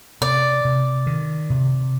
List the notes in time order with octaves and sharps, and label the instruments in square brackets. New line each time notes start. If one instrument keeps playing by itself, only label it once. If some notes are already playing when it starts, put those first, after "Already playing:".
[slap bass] C3 [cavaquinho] D5
[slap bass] C3
D#3
C3